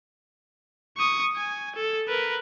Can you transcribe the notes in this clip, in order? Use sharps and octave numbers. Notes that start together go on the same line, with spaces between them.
C#6 D#6
G#5
A4
A#4 B4